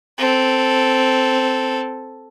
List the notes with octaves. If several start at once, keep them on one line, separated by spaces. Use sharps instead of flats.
C4 A4